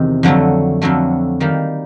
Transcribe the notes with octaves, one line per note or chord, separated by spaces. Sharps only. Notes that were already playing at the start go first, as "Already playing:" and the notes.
Already playing: E2 C3 D#3
F2 D3 F#3 A3
F2 D3 F#3 A3
D#3 G3 A#3